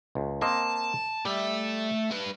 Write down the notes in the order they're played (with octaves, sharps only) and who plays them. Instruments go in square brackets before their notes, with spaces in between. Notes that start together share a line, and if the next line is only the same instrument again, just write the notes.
[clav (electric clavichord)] C#2
[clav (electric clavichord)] A#3 C4 D#5 [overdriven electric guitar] A5
[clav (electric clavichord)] G3 [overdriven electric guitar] A3 E5
[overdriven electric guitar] G3 B4